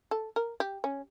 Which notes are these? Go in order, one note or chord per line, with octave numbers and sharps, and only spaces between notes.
A4
A#4
G4
C#4